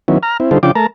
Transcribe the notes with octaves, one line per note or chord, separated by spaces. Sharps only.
D#3 F#3 B3 C#4 E4
A#5 F6
C4 E4
D3 G3 D#4 F4 A4 C5
C#3 F3 D4 F4 G5 D6
A3 A#4 A5 A#5